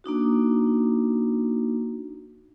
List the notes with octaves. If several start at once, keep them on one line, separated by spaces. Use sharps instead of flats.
A#3 D4 D#4 F#4